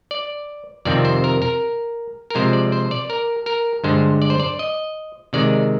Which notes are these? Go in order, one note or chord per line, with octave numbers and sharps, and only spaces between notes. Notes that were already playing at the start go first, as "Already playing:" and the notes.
D5
F2 C3 D#3 G3 C4 D5
C5
A#4
A#4
A#4
C3 F3 G#3 C5
D5
C5
D5
A#4
A#4
G2 D3 G#3 C5
D5
C5
D5
D#5
C3 D#3 G#3 D5